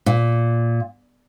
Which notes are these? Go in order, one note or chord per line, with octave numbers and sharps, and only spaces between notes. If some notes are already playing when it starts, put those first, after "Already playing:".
A#2